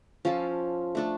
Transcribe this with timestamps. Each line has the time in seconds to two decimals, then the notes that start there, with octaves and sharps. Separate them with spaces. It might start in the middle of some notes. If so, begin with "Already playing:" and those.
0.25 F3 C#4 F4 A4
0.95 A3 D4 A4